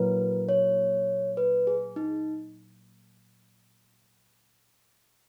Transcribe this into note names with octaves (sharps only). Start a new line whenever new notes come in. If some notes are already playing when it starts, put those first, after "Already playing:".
Already playing: A#2 F#3 A#3 E4 A#4 B4
C#5
B4
G#4
D#4